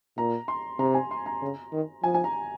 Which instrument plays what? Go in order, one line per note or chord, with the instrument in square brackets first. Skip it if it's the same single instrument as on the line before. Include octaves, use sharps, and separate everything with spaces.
[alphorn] A#2 [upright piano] A#5
[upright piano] C6
[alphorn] C3 [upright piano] A#5
[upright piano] G#5
C6
A#5
[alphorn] C#3
D#3
[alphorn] F3 [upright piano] G#5
[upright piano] G#5
A#5